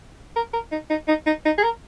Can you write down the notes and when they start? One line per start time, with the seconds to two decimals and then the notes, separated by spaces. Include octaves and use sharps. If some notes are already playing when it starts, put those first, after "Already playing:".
0.36 A#4
0.53 A#4
0.72 D#4
0.90 D#4
1.08 D#4
1.26 D#4
1.45 D#4
1.58 G#4
1.63 A#4